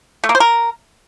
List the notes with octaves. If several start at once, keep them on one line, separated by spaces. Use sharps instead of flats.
A3
A#3
C5
A#4